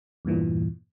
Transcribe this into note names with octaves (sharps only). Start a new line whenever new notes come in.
E2 G2 A#2 E3